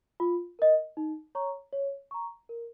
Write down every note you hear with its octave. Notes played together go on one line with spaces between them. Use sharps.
F4
A#4 D#5
D#4
C#5 A#5 C#6
C#5
A#5 C#6
A#4